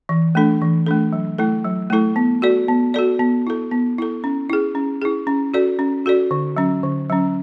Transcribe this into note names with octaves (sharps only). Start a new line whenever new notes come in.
E3
A3 D4 A4
E3
A3 D4 A4
F#3
A3 E4 A4
F#3
A3 E4 A4
B3
F#4 A4 D5
B3
F#4 A4 D5
B3
E4 A4
B3
E4 A4
C#4
E4 G#4
C#4
E4 G#4
C#4
F#4 A4 D5
C#4
F#4 A4 D5
D3
F#3 C#4
D3
F#3 C#4